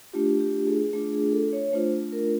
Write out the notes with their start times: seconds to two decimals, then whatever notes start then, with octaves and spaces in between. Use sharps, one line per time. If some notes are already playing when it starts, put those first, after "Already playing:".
0.13 A3 D4 F4 G4
0.40 G4
0.67 G#4
0.93 A3 D4 F4 G#4
1.13 G#4
1.33 A4
1.53 C#5
1.73 A3 D4 F4 C5
2.12 A#4